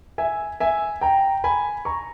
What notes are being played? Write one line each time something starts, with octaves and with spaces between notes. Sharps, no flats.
E5 G#5
E5 G#5
G5 A#5
G#5 B5
A#5 C#6